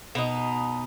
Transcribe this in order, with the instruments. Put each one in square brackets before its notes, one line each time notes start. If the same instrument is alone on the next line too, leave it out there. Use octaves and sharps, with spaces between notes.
[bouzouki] B2 D#4